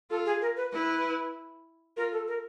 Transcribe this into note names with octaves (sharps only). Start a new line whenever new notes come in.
F4 A4
G#4
A#4
B4
E4 B4
F4 A#4
A4
A#4